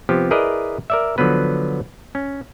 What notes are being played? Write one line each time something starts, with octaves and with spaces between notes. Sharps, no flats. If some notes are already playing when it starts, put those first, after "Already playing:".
C3 F3 B3 G4
E4 G#4 A#4 B4 D5 D#5
A#4 D5 E5
D3 F3 F#3 B3 B4
C#4